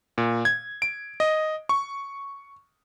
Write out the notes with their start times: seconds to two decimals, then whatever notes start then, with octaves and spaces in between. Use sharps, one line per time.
0.18 A#2
0.45 G#6
0.82 D7
1.20 D#5
1.69 C#6